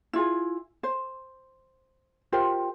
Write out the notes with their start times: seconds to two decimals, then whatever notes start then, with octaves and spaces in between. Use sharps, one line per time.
0.13 E4 F4 G#4
0.83 C5
2.32 F4 G4 A#4 C5